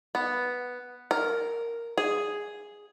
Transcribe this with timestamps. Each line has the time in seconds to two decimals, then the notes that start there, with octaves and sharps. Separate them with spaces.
0.15 B3
1.11 A#4
1.98 G#4